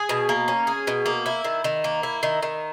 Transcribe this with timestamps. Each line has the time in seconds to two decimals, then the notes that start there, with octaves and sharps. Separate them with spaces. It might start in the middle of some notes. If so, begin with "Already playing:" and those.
Already playing: G#4
0.09 B2
0.29 A#3
0.48 C#4
0.67 G#4
0.87 B2
1.06 A#3
1.26 E4
1.44 D#3
1.64 D#3
1.84 A#3
2.03 E4
2.23 D#3
2.42 D#3